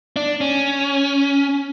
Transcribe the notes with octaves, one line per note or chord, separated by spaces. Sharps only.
D4
C#4